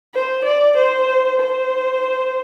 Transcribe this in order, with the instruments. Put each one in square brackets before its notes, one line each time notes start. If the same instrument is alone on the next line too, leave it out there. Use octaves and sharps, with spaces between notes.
[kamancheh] C5
D5
C5
C5